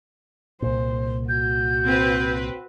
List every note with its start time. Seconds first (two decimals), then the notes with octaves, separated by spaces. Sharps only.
0.62 C2 A#2 C5
1.29 F#4 G6
1.84 C4 B4